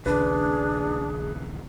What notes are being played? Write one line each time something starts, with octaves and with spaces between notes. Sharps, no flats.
A#1 D#2 C#3 D4 G#4 B4